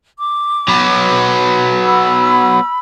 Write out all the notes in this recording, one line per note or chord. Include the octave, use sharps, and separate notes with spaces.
D6
F#3 B3
B5 E6